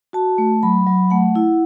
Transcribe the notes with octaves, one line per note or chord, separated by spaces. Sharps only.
F#4 A5
A3
F#3 B5
F#3
A3 F#5
E4